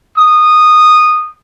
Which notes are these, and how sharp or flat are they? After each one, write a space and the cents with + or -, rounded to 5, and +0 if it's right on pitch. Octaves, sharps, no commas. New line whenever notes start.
D#6 -15